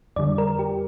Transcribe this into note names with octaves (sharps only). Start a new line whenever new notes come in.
F2 D3 G3 D5
A#4
G4